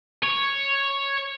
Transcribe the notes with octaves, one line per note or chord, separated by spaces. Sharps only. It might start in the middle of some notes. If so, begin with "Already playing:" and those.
C#5